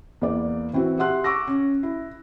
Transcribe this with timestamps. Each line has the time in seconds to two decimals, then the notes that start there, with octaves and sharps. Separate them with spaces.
0.21 E2 A#3 D5
0.73 E3 C4 E4 F#4
0.99 G4 E5 F#5 C6 F#6
1.24 C#6 D6 E6 A#6
1.47 C#4
1.83 E4